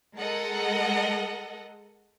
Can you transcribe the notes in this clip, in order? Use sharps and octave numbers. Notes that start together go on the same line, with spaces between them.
G#3 A4 A#4 D#5 F#5